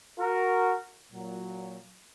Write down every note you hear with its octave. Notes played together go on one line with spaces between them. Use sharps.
F#4 A#4
A#2 F#3